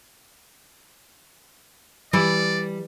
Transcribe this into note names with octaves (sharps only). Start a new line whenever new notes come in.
E3 G3 E4 D5